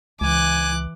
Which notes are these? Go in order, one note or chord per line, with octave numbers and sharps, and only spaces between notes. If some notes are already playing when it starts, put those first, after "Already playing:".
C#2 E3 G#5 D6 F#6